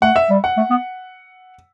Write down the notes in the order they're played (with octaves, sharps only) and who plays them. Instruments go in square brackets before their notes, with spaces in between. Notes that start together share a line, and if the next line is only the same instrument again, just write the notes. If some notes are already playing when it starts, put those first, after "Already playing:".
[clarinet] A3 [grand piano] F#5
[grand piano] E5
[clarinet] G3
[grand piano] F#5
[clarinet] A3
B3